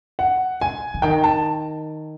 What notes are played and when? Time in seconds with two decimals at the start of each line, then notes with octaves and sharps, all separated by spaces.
0.19 F#5
0.61 G#5
0.94 D3
1.02 D#3 G5
1.24 A5